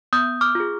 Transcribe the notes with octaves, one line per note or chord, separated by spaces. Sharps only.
B3 D#6 G6
D6 F6
F4 G#4